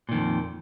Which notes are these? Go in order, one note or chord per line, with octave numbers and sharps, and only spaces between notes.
F2 A#2 D#3